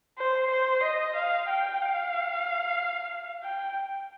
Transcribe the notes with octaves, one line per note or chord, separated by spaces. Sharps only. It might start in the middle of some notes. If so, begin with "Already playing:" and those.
C5
C5
D#5
F5
G5
F5
G5